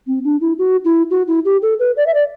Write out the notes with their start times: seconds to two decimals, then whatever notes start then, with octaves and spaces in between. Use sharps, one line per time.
0.07 C4
0.24 D4
0.41 E4
0.59 F#4
0.85 E4
1.11 F#4
1.28 E4
1.45 G4
1.62 A4
1.79 B4
1.97 D5
2.06 E5
2.14 D5